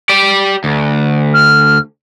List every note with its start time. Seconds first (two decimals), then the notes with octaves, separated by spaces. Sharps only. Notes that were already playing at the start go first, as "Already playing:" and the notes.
0.09 G4 D5
0.64 D2
1.34 F6